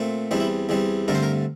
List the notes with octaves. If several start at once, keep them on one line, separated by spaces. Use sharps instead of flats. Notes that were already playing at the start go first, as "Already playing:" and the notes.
Already playing: A#2 A3 C4
E2 E3 G3 C4 D4
E4
E2 E3 G3 C4
G2 D3 A3 C4 A#4
C5
A#4